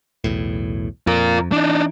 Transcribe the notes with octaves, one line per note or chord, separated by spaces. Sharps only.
B1 E2 A2
F2 F4 A#4
E3 D4 D#4